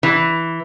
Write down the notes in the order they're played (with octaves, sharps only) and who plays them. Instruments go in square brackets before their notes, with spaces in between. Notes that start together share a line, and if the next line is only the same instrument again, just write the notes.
[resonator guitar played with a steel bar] E3